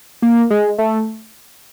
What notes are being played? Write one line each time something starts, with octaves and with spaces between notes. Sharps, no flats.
A#3
G#3
A3